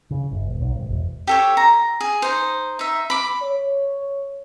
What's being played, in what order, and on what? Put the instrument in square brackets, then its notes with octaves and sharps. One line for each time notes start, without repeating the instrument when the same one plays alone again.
[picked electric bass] C#3
G1
D#1
B1
G#1
E1
[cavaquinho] G4 A4 C#5
A#5
G#4
D#4 C5
D#4 E5
B5 D6
[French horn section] C#5